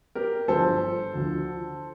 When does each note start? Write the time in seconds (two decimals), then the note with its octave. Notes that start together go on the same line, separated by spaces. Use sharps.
0.15 G4 A#4
0.48 G1 G2 F3 A4 C5
1.14 D2 D3 F3